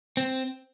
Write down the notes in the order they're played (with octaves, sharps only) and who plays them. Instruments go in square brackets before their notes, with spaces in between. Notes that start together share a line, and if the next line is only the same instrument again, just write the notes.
[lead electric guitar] C4